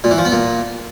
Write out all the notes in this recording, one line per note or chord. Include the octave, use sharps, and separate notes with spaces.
A#2
E3
F3
B3
A#2